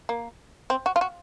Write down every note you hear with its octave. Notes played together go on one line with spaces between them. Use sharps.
A#3
C4
F#4
F4
F#4